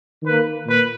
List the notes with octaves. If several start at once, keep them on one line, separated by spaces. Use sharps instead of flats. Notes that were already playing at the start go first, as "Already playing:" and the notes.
D#3 A#3 B4
A#2 B4